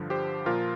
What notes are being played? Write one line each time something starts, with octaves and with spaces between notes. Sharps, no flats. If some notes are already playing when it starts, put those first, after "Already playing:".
Already playing: G2 D3 F3
G4 C5
A#2 F3 F4 A#4